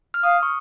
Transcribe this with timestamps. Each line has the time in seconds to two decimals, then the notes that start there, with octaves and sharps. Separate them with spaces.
0.14 F6
0.23 F5 D#6
0.43 C#6